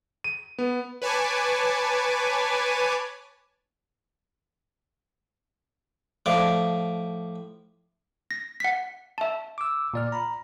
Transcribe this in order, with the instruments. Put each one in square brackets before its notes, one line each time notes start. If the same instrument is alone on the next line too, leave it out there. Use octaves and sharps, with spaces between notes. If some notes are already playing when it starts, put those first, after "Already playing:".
[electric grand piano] D#7
B3
[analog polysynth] B4 C#5 G#5 A5 D6
[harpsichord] A2 F3 D5
[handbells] A#6
F#5 B6
E5 A5
[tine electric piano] D6 E6
A#2 D5 F6
A#5 B5